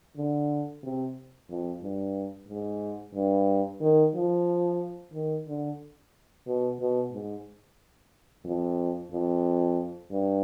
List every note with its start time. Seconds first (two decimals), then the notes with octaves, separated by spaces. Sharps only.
0.16 D3
0.83 C3
1.50 F2
1.82 G2
2.49 G#2
3.15 G2
3.81 D#3
4.14 F3
5.13 D#3
5.47 D3
6.47 B2
6.80 B2
7.12 G#2
8.45 F2
9.11 F2
10.11 G2